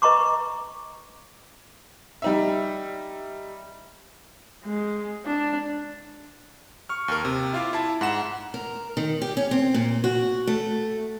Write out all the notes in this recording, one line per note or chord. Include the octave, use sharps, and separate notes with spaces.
B4 D#5 A#5 C#6 D6
G3 D#4 E5
G#3
D4
C#6 F6
D#2 A#4
C3
E4 F4 F5 D6
E4 A5
G#2 F#5 E7
A#4
D#3
G4
C#4
C4
A#2
F#4
A3